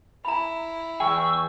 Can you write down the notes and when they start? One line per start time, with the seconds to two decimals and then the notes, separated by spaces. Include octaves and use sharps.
0.25 E4 A#5 B5
1.00 E2 G#4 G5 C#6 E6